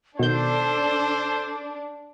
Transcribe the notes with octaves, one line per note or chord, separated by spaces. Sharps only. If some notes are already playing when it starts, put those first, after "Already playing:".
B2 D#3 D4 A4 C5 G6